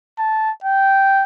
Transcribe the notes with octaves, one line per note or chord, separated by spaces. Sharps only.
A5
G5